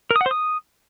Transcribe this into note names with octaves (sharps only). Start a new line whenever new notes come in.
A#4
D#6
F#5
C5
D#6